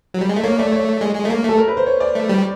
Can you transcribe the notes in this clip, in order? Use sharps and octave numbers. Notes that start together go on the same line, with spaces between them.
F#3
G3
G#3
A3
A#3 C#5
A3 D5
C#5
G#3
G#3
A3
A#3
A3 A4
A#4
B4
C5
C#5
D5
A3
G3